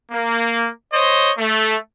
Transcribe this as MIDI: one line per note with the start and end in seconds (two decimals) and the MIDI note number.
0.12 0.68 58
0.93 1.31 72
0.93 1.31 73
0.93 1.31 75
1.39 1.76 57